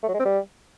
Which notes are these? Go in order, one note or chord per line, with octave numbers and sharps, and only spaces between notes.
A3
F#3
G#3
C4
G3